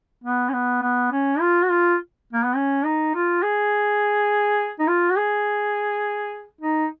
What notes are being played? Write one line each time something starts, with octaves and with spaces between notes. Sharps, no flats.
B3
C#4
B3
B3
C#4
F4
F#4
F4
A#3
B3
C#4
D#4
F4
G#4
D#4
F4
F#4
G#4
D#4